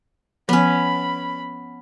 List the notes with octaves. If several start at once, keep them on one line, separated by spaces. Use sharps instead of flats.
F3 B3 C#4 B5